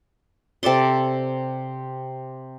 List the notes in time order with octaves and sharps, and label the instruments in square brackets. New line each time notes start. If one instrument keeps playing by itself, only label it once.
[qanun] C3 A4 D5 C6